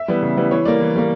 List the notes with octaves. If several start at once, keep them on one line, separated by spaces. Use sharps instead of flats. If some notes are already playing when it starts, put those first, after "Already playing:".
Already playing: E5
E3 G3 B3
C#3
E3 G3 B3
E3 C#5
G3 A#3 D5
E3
G3 A#3